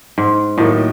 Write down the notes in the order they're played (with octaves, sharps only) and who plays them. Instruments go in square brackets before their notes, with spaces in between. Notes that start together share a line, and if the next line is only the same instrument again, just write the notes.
[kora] G#2
[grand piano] D#2 D#3 F#3 A#3 D#4 [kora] A2